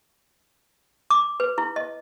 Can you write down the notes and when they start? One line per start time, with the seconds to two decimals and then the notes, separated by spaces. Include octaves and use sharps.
1.10 D6
1.40 B4
1.58 E4
1.76 D#5